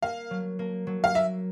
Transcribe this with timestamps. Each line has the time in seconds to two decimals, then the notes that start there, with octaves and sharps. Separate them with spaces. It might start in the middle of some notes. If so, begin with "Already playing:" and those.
0.02 A#3 F5
0.31 F#3
0.59 A#3
0.87 F#3
1.04 F5
1.15 A#3 E5